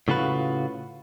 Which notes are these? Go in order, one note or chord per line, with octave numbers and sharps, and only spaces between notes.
A2 C#3 F4 F#4 B4